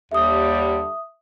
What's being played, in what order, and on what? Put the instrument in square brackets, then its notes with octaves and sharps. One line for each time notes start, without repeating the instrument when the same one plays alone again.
[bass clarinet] D#2 [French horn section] D3 G3 [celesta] E5 D#6